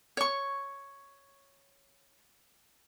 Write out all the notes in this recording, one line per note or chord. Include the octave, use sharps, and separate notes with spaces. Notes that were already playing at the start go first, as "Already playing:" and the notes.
C#5 C#6